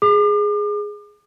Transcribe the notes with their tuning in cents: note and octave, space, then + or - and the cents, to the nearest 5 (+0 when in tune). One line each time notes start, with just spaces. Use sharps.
G#4 +0 D6 +40